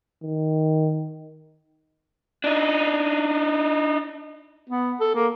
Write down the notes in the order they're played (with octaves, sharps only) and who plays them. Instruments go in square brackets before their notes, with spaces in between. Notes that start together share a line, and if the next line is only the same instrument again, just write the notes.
[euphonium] D#3
[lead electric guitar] D4 D#4
[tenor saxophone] B3
A4
A#3